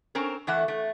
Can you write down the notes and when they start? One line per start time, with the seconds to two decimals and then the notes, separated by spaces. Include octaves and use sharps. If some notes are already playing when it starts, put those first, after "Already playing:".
0.15 C4 C#4 A#4
0.47 E2 E3 A3 F#5
0.68 A3